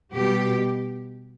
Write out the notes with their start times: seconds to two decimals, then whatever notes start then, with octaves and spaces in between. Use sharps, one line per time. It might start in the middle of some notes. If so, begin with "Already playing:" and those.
0.14 B2 G3 G4